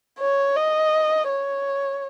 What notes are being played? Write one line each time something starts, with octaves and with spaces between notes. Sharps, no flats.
C#5
D#5
C#5